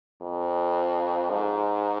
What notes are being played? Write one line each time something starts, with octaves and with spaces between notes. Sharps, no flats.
F2
G#2